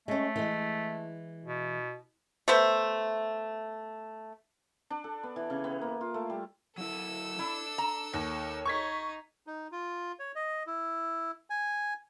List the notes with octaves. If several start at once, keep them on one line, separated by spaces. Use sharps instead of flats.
G#3 A3 C#4
E3 G#3
B2
A3 B3 C5 E5
D4
A4
B3
E3
C#3
B3
A#3
F4
A3
G3
F#3 E4 A4 E6
D4 E4
A#5
D#2 C#5
D#4 C#6 G#6 B6
D#4
F4
C#5
D#5
E4
G#5